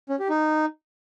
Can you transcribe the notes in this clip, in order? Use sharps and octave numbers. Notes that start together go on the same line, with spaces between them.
C#4
G4
D#4